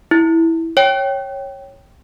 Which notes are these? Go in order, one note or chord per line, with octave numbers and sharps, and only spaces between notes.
E4
C#5 G5